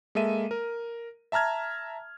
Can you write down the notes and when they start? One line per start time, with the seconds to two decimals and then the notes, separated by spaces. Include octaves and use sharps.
0.15 G#3 A#3 A4 E5 D#7
0.51 A#4
1.32 E5 A5 A#5 F6 G#6